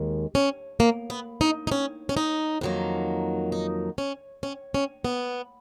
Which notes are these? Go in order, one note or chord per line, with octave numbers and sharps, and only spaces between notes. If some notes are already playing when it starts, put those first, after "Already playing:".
Already playing: D#2 D#3 G#3
C#4
A#3
B3
D#4
D#4
C#4
C#4
D#4
F2 D#3 F#3 A#3
D#4
C#4
C#4
C#4
B3